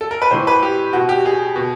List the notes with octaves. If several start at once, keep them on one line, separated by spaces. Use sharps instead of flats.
A4
A#4
B4
A2 E3 C5
B4
G4
B2 F#4
G4
G#4
B2